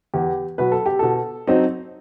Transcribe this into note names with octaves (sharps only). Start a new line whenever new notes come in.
E2 G4
B2 F#3 B4
A4
G4
B2 A4
F#3 C4 D#4